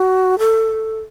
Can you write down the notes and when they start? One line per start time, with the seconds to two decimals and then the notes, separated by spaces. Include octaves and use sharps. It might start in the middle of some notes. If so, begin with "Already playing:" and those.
Already playing: F#4
0.39 A4